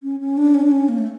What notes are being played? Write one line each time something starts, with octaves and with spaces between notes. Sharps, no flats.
C#4
C#4
D4
C#4
D4
C#4
A#3
A3